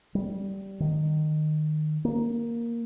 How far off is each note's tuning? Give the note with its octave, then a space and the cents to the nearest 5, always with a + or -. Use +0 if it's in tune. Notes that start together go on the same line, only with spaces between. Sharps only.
G3 -10
D#3 -20
A#3 +5